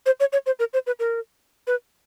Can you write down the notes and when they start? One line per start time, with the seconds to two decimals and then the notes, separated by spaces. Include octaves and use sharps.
0.06 C5
0.20 C#5
0.33 C#5
0.46 C5
0.59 A#4
0.74 C5
0.87 B4
1.00 A#4
1.67 B4